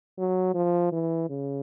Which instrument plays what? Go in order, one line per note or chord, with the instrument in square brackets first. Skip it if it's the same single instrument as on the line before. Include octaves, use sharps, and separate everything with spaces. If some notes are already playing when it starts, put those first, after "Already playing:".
[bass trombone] F#3
F3
E3
C#3